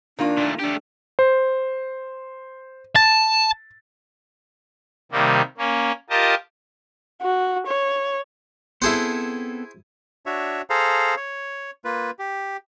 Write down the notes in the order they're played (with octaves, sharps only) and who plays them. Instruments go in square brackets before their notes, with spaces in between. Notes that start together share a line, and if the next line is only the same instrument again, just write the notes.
[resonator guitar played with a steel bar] D#3 A#3 F4 [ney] D4
[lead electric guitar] A#2 A3
[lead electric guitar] A3 G4 [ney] D4
[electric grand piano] C5
[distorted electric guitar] A5 [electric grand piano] A6
[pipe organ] C3 D#3 G3 A#3
A#3 C#4
F4 G4 A#4 D#5 A5
[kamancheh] F#4
C#5
[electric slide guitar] B3 C4 A4 [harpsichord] E4 G#4 C5
[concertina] D4 F#4 C#5 E5
G#4 A4 C5 F5 A#5
C#5
A#3 F4 B4
G4